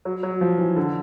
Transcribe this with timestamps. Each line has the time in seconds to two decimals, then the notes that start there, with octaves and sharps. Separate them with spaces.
0.05 F#3
0.23 F#3
0.41 F3
0.58 E3
0.77 D3